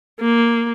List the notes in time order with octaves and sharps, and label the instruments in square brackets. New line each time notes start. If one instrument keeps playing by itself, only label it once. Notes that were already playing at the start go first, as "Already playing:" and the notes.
[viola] A#3